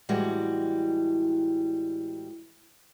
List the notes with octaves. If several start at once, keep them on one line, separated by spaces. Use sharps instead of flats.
A2 E3 G3 G#3 F#4